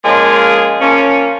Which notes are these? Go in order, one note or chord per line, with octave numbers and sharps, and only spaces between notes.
F3 G#3 A#3 C#4 G#4
F3 A#3 C#4